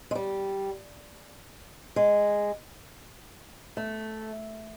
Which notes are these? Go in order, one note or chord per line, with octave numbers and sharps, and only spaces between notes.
G#3
G3
G#3
A3